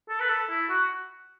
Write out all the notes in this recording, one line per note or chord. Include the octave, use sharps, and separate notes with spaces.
A4
B4
A4
E4
F#4